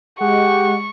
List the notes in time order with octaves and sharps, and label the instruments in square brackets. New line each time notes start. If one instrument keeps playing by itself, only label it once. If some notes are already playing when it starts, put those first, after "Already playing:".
[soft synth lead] G#3 [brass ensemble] G4 [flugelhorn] F#5 [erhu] C#6